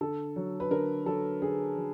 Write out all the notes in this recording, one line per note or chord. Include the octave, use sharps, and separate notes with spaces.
D3 A4
F#3
B4
D3 A#4
F#3 A4
D3 G#4
F#3